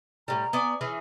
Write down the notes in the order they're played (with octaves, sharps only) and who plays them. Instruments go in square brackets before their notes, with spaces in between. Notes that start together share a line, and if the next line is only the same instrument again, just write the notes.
[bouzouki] A2 G3 [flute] A#5
[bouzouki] B3 D5 G#5
E3 C#4 G#4